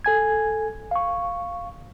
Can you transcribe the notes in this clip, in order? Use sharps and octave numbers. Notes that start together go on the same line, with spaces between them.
A4 G#5 G#6
F5 C#6